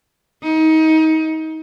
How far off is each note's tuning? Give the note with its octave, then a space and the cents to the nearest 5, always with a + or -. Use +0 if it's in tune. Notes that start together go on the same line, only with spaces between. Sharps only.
D#4 +30